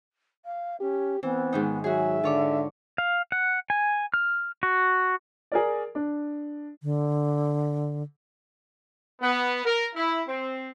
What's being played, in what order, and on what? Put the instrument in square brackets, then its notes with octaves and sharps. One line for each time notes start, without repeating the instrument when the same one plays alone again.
[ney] F5
[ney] C#4 [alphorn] G4
[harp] E3 [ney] B3 [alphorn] C4
[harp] G#2 D#3 D#4
[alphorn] F#3 [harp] F#4 G#4 [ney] E5
[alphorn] D3 [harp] F4 C#5 D6
[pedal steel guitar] F5
F#5
G#5
F6
F#4
[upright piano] G#4 A#4 D5
D4
[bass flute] D3
[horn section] B3
A#4
E4
C4